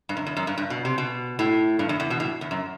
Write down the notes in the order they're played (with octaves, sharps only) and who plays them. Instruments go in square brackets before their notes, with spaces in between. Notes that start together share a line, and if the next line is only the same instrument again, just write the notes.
[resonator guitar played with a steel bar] G2
F#2
E2
F#2
G2
G2
B2
C3
B2
A2
G2
E2
E2
B2
A2
E2
F#2